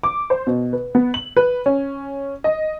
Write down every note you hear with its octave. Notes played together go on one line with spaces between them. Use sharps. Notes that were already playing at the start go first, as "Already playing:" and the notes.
D6
C5
B2
B4
B3
F#7
B4
C#4
D#5